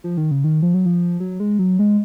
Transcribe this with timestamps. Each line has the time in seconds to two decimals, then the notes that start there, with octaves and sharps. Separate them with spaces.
0.04 F3
0.17 D#3
0.31 C#3
0.44 D#3
0.62 F3
0.74 F#3
0.86 F3
1.20 F#3
1.40 G#3
1.59 F#3
1.79 G#3